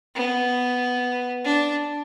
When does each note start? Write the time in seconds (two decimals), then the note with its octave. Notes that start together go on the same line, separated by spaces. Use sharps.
0.16 B3
1.44 D4